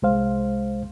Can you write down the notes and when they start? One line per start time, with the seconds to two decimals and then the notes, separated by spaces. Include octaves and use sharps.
0.02 C2 G#3 C5 F5